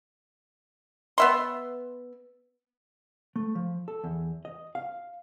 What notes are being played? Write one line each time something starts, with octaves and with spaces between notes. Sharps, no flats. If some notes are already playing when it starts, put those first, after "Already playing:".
B3 E5 C6
A3
F3
A4
E2
D#5
F5